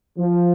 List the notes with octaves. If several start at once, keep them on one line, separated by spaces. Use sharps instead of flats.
F3